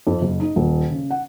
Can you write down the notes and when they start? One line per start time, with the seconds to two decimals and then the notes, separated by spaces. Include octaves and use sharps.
0.07 F2
0.22 F#1
0.40 D#4
0.56 D#1
0.91 C#3
1.11 F#5